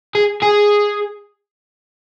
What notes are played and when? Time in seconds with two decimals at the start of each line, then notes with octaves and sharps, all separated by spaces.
0.15 G#4
0.43 G#4